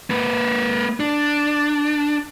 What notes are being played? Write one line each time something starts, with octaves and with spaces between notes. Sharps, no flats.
A#3 B4
D4